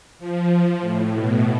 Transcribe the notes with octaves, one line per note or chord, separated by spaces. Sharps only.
F3
A2
B2